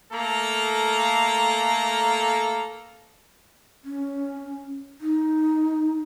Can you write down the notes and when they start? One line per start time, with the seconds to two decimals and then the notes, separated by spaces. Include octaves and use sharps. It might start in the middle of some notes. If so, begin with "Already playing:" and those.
0.12 A3 A#3 A4 A#5
3.84 C#4
5.01 D#4